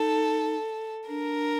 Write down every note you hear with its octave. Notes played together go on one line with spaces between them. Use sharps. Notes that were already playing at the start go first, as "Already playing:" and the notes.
Already playing: D#4 A4
D4 A#4